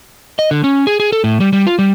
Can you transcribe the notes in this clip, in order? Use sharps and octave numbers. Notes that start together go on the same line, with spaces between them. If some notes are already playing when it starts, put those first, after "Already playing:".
D#5
D3
C#4
G#4
G#4
A4
A2
G3
G3
F4
G3